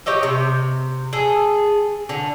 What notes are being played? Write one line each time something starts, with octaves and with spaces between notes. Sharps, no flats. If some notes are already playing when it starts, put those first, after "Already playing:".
G4 C#5 D#5 E5
C3
G#4 A4
D3